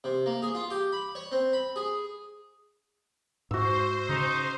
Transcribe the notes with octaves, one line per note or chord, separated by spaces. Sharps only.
C3
A#3
G#4
F4
G4
B5
C#5
C4
B5
G#4
G#2 F#4 C5 E6
C#3 D#4